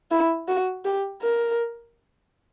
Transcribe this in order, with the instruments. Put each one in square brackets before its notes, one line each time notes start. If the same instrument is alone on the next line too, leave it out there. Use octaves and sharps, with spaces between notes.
[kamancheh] E4
F#4
G4
A#4